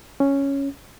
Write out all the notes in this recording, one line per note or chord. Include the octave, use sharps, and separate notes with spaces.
C#4